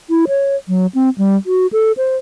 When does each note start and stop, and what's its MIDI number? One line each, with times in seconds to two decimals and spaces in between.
0.10 0.25 64
0.28 0.56 73
0.68 0.86 54
0.95 1.09 60
1.18 1.36 55
1.46 1.67 66
1.73 1.92 69
1.97 2.16 72